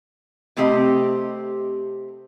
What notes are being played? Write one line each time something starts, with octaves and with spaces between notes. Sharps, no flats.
C3 A3 C4 G4 D#5